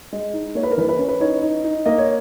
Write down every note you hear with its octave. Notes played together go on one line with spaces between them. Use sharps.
G#3
D#4
A#3 C#5
B4
A#4
E3 B4
B4
C#4
B4
D#4 C#5
D#4
D#4
A#3 D#5
C#5